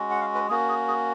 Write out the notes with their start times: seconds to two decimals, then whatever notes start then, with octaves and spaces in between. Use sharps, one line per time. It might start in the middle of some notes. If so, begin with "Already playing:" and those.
Already playing: G#3 C#4 F#4
0.10 F#5
0.21 F5
0.35 B4
0.49 A#3 C#4 F#4 G#4
0.69 G#4
0.88 G#4